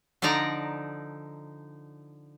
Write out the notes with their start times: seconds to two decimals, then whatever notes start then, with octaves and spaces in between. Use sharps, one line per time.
0.22 D3 F3 D#4 D5 A#5